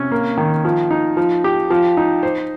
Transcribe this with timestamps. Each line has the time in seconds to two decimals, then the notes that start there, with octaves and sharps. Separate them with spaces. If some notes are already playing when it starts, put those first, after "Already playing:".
Already playing: C3 C#4
0.11 A#3
0.37 D#3
0.65 F3
0.91 D#4
1.17 F3
1.44 G4
1.70 F3
1.97 D#4
2.23 C5